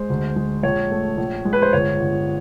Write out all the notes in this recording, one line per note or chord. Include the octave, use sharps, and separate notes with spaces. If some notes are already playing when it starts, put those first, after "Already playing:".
Already playing: G#3 C5
D2
G#3
A#1 C#5
A3
A#1
G#3
B4
C5
G1 C#5
G1